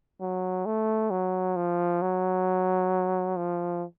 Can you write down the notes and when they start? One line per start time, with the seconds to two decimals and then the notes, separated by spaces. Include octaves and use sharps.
0.21 F#3
0.66 A3
1.11 F#3
1.57 F3
2.02 F#3
3.37 F3